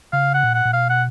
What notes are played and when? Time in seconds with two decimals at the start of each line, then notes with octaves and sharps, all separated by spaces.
0.12 C#3 F5
0.34 F#5
0.43 A#2
0.54 F#5
0.65 A#2
0.73 B2 F5
0.89 F#5